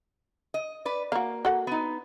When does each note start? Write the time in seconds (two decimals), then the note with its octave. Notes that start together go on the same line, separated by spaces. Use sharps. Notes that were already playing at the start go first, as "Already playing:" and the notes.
0.54 D#5
0.85 B4 D5
1.12 A#3 F#4 F5
1.45 F#4 A4 F#5
1.67 B3 D#4